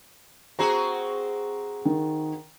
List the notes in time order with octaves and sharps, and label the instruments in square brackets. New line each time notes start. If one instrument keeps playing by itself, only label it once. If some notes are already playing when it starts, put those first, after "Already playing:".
[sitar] C4 F#4 G#4 [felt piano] A#5
[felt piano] D#3